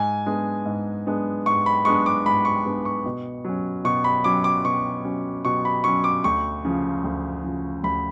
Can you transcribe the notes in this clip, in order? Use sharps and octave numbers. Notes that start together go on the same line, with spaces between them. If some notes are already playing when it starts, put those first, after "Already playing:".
Already playing: G#2 G#5
G#3 B3 D4
G#2
G#3 B3 D4
G#2 C#6
B5
G#3 B3 D4 C#6
D6
G#2 B5
C#6
G#3 B3 D4
C#6
B2
F#3 C#4
B2 C#6
B5
F#3 C#4 D6
D6
B2 C#6
F#3 C#4
B2 C#6
B5
F#3 C#4 C#6
D6
D2 C#6
C#3 F3
D2
C#3 F3
D2 B5